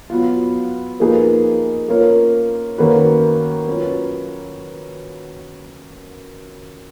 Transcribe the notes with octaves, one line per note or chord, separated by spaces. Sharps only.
F#3 B3 F4
F3 A#3 D#4 G#4 B4
A#3 C#4 F4 A#4 C#5
D#3 A#3 C#4 F#4 B4
F#3 C#4 F4 B4